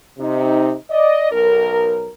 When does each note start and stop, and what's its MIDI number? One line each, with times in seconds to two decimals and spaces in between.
0.19 0.74 48
0.19 0.74 63
0.90 1.31 74
0.90 1.31 75
1.32 2.10 35
1.32 2.10 70